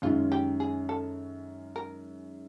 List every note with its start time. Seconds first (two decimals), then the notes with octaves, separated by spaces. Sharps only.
0.02 F#2 D#3 G#3 C#4 F4
0.32 G4
0.60 G#4
0.89 A4
1.76 A#4